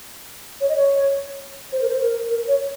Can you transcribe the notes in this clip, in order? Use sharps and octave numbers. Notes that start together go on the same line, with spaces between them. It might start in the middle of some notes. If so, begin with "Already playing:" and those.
C#5
D#5
C#5
C5
A#4
C5
A#4
A#4
C#5